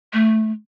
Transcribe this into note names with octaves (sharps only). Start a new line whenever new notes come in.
A3